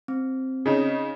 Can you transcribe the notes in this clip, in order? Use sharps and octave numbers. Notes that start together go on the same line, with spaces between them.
C4
C#3 D#4